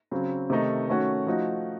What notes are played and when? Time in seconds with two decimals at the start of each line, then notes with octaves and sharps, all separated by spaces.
0.11 C#3 F#3 C4
0.50 C3 D#3 A3 D#4
0.88 D#3 A3 C#4 F#4
1.26 F3 A3 D#4 F#4